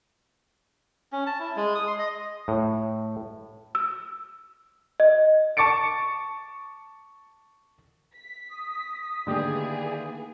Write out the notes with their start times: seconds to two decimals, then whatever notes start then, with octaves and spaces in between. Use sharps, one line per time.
1.12 C#4
1.27 A5
1.40 E4
1.56 G#3
1.75 D#6
1.87 C6
1.99 D#5
2.48 A2
3.75 E6
5.00 D#5
5.57 A5 C#6 D6 A6 C#7 D7
8.14 B6
8.51 D#6
9.27 D3 D#3 A#3 E4 G4 G#4 B4